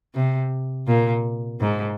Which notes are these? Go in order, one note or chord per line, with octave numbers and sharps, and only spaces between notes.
C3
A#2
G#2